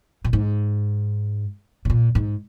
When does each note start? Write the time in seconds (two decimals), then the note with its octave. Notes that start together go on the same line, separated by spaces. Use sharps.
0.24 A#2
0.33 G#2
1.85 B2
1.90 A#2
2.15 G#2